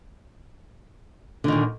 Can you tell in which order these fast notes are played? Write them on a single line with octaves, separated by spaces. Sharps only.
D3 D#3 A#2